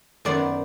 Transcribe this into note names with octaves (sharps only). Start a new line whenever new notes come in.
F#2 D#3 F#3 B3 C5 D5